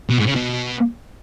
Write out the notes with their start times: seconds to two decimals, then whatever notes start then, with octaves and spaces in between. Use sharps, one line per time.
0.10 B2
0.18 G#2
0.27 C#3
0.35 B2